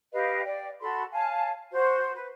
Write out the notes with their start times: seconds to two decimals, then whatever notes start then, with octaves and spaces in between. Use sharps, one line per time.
0.12 G4 B4 D#5 F5
0.44 D5 G5
0.81 F#4 A4 B5 C6
1.13 C#5 F5 G#5 A5
1.72 F#4 C5
2.14 B4